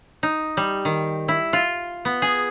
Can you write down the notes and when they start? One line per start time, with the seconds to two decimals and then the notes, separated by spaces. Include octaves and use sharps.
0.23 D#4
0.57 G3
0.85 D#3
1.28 E4
1.53 F4
2.05 B3
2.22 G#4